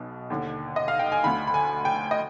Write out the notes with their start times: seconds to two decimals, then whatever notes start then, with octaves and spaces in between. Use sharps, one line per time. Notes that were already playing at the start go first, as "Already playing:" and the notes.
Already playing: B1 B2
0.30 D#2 D3
0.76 D#5
0.88 F5
0.99 G5
1.12 G#5
1.24 D2 D3 B5
1.47 B5
1.54 G#5
1.85 G5
2.11 D#5